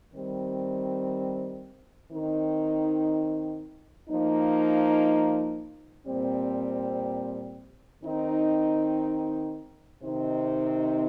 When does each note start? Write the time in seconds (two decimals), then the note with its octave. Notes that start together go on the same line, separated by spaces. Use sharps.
0.12 D#3 G3 C4
2.10 D#3 C4 D#4
4.09 F3 A#3 D#4
6.06 A#2 G3 C4
8.03 D#3 C4 D#4
10.01 C3 D#3 C4 D#4